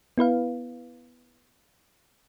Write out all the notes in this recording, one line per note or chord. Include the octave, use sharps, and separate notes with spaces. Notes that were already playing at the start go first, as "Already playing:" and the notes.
B3 E4 B4 F5